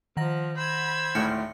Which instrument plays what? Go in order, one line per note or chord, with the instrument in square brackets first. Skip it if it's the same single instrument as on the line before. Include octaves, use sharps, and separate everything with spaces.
[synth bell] D#3 F#5 A#6 [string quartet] F3
[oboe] C5 [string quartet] B5 E6 G#6
[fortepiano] G#1 D2 A2 [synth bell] C6 F6 C#7